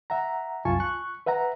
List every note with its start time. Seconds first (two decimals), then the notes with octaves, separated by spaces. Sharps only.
0.10 E5 F#5 A#5
0.65 C2 F#2 F4 G#5 A5 C#6
0.80 C#6 F#6
1.26 B4 E5 F#5 A#5